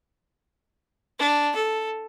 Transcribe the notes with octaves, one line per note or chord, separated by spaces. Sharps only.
D4
A4